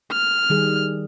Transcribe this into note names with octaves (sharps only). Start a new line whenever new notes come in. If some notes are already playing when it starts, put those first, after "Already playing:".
F6
D#3 G3 G#4